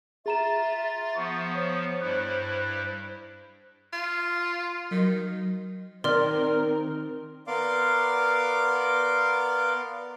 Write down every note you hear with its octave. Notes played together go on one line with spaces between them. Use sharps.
F4 G#4 E5 A#5 A6 E7
F3 B3 C#6
C5 C#5
G2 G3 E4 F#6
F4
D#3 F#3
D#3 C4 A#4 D5 C6 F6
B3 A#4 D5 F5 C6 D6